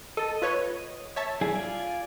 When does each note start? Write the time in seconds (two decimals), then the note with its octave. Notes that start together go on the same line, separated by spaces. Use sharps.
0.17 A4 D#5
0.42 F4 B4 C#5
1.16 C#5 E5 A5
1.41 G3 E4 G#4
1.55 F4 D5 G#5